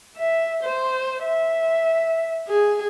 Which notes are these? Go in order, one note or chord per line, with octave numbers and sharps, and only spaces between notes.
E5
C5
E5
G#4